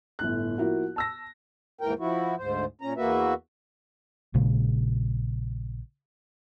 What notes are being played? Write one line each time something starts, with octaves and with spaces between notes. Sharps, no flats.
G1 A2 F#6
F3 A#3 E4 F#4
A5 E6 A#6
D#2 G#2 E3 A#4 G5
F3 E4 F#4
D2 G#2 C5
A#2 C#4 A#5
E2 A#3 F#4 B4 E5
A#1 A#2 C#3 G#3